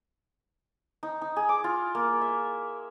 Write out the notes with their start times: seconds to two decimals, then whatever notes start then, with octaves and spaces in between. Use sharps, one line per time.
1.03 D#4
1.21 D#4
1.36 G#4
1.49 D6
1.64 F4
1.95 A#3
2.21 E5